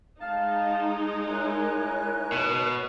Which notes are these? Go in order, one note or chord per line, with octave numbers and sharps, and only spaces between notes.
G#3 D#4 F5 A5
E4 A#4 C#5 G#5 F#6
B2